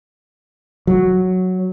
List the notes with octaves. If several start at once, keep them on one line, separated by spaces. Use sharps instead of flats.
F#3